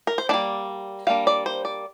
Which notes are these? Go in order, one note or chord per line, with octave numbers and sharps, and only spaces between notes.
A#4
C5
G3 A#3 D4 D5
G3 A#3 D4 F5
D5
C5
D5